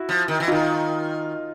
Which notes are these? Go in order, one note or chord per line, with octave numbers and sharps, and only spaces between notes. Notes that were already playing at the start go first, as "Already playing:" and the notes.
Already playing: E4 F#4
F3
D#3
E3
D#3 D#4 F4